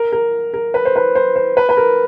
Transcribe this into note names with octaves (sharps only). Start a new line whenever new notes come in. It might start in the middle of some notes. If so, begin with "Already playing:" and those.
Already playing: A#4
A#4
A#4
B4
C5
B4
C5
C5
B4
B4
A#4